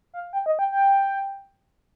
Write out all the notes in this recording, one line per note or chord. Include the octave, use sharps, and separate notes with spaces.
F5
G5
D#5
G5
G5